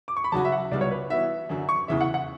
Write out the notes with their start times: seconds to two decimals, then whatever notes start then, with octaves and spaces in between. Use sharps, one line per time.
0.08 D6
0.17 C#6
0.24 B5
0.32 C#3 F#3 C#4 F#4 A5
0.45 E5
0.52 F#5
0.71 C#2 C#3 G3 B3 F#4 D5
0.81 C#5
0.91 B4
1.10 E3 B3 F#4 E5
1.49 F#2 D3 F#3
1.69 C#6
1.88 E2 C#3 E3 E5
2.01 F#5
2.14 F#5